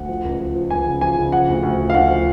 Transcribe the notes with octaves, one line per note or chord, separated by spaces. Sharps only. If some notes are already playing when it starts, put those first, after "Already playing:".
Already playing: D2 F#5
F3
C#2
F3
F3
C#2 G#5
C#3
F3 G#5
C#3
F3 F#5
D2
D2
F3
F5
D2 F#5
F3